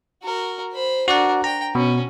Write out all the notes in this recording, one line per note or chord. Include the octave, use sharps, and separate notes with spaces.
F#4 A#4
C5 B5
D4 F#4 A#4 D5 F#5
G5 A#5
B2 C#4 F#4